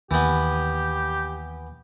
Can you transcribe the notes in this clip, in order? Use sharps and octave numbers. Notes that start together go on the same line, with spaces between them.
D#2 E3 B3 G4